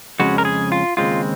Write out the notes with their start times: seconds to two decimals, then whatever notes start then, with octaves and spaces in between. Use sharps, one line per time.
0.19 F2 C#3 G#3 C#4 F#4
0.38 A#4
0.45 G#4
0.72 F4
0.97 D#2 C#3 G#3 C4 F4